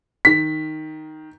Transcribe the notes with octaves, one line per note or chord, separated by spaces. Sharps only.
D#3 B6